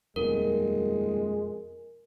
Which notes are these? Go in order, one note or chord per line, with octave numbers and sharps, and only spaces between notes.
D#1 F2 B2 G#3 A#4